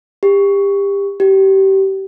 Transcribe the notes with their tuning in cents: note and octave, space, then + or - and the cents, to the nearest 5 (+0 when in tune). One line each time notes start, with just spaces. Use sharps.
G4 +25
G4 -25